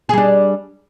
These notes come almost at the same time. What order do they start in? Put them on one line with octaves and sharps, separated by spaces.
G#4 G3 D4